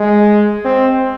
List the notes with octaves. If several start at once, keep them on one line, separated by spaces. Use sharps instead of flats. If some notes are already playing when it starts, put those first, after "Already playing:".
Already playing: G#3
C4